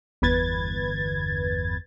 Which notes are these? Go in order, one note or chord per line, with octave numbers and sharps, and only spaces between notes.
G1 E2 B4 G#6 A6